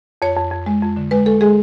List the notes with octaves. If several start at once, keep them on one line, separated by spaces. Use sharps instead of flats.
F2 C#5
F2
F2
G#3
F2
D3
G#3 B4
G#3 A4
G#3 G#4